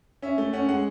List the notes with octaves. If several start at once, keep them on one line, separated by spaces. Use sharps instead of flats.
C#4 E5
A3
C#4 F#5
G#3 F#5